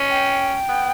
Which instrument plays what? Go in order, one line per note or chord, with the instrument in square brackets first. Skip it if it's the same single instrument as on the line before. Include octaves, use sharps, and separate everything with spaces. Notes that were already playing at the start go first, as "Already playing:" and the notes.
Already playing: [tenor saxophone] C#4
[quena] G5
[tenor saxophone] B3